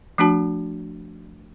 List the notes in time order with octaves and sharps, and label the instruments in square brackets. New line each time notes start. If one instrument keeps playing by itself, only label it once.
[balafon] F3 A3 D4 F#4 A5